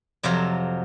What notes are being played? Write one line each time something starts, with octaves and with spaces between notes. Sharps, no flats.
F2 C3 F3 F#3 F4 A#5